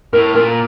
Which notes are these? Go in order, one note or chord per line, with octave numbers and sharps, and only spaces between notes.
A2 A#4
A#2 A#4